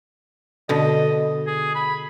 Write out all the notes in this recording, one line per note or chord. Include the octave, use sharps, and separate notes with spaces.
B2 D3 D#5
G#4
B5